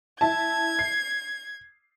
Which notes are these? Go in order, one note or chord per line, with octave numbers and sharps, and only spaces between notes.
E4 E5 A5 G#6
C7